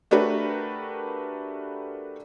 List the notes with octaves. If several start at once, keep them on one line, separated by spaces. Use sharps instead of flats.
A3 D4 F#4 G4 A#4 B4